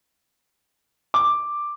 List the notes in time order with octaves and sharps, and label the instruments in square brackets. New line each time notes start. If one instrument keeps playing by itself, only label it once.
[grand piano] D6